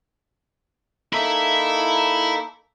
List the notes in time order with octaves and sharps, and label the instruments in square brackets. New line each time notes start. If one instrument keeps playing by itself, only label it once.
[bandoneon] A#3 D#4 A4 [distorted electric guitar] E4 E5